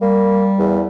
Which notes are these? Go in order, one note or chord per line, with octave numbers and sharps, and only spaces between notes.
G3 A#3
E2